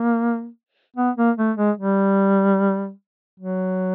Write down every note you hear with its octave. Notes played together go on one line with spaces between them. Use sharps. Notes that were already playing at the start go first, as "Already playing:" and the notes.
Already playing: A#3
B3
A#3
A3
G#3
G3
F#3